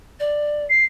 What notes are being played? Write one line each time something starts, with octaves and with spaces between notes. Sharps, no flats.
D5
C7